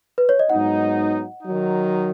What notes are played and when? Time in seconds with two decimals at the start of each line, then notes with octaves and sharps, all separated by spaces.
0.18 B4
0.29 C#5
0.39 D#5
0.50 G#2 F#3 B3 D#4 F#5
1.43 D#3 F#3 D#4